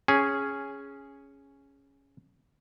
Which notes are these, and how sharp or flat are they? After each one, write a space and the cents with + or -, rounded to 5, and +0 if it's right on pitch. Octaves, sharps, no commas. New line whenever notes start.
C#4 +0 G#4 +0